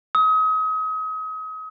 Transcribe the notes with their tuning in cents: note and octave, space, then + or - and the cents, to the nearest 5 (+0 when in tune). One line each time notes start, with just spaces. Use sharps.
D#6 +35